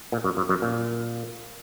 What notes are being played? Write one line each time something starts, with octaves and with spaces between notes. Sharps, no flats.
A#2
F#2
F#2
F#2
A#2